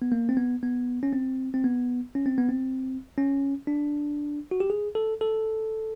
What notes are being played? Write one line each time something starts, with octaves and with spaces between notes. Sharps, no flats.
B3
A#3
C4
B3
B3
C#4
C4
C4
B3
C#4
C4
B3
C4
C#4
D4
F#4
G4
G#4
A4
A4